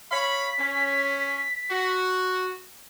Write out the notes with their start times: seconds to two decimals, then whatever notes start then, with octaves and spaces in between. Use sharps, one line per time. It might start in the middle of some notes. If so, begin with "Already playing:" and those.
0.11 C#5 F5 B5 B6
0.58 C#4
1.71 F#4